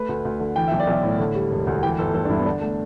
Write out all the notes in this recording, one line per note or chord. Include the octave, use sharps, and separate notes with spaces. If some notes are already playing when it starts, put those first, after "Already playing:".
Already playing: A3 B4
D2
D2
D3
E3 G5
B1 E5
D5
B1 E5
A2
D3
G3
E1
D2
E3 G5
G1 A4
G1 A4
D4
G2 E4
B3
D3 D4
A3